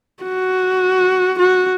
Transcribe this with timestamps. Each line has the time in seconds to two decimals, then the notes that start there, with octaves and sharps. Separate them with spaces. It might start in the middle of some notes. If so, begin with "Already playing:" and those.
0.23 F#4
1.39 F#4